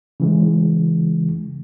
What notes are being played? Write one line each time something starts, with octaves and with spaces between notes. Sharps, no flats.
C#3 E3 G#3